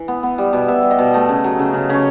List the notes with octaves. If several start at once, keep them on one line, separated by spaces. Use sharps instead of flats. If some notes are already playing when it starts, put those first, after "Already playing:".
Already playing: E3
B3
B3
G3
B2
B2 E5
G3
D#5
B2
A3
C#3
F#3
C#3
C#3
C#3 C#5